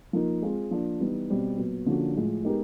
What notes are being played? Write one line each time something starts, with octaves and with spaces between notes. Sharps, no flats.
F3 A#3 D#4
G#3 C4 F4 G#4
F3 A#3 D4
E3 G3 B3 D#4
B2 G3 C4
A#2 F#3 B3
D3 F3 A#3 C#4 F#4
A2 F3 G#3
G#3 B3 D#4 G4 A#4